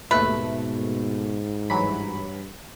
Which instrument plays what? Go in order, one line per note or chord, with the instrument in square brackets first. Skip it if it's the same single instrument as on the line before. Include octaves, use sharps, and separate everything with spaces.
[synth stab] D#2 A3 [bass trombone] G#2 [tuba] B2 [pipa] B4
[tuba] G2 [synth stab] E3 F#3 B5